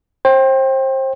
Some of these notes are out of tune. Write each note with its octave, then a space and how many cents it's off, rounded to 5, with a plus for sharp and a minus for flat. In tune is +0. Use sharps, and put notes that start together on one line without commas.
C5 +30 G5 +0